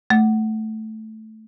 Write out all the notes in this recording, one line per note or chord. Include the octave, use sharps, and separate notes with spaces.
A3